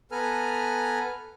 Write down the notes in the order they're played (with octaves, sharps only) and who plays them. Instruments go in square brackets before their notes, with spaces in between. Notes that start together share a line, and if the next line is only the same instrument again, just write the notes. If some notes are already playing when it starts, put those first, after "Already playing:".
[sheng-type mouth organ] B3 A4 B4 G#5 A#5 F6